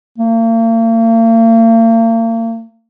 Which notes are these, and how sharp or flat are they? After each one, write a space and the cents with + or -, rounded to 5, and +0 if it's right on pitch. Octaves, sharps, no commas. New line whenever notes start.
A#3 -45